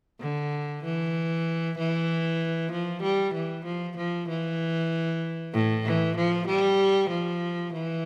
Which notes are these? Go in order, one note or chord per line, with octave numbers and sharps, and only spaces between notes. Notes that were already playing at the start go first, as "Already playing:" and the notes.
D3
E3
E3
F3
G3
E3
F3
F3
E3
A2
E3
F3
G3
F3
E3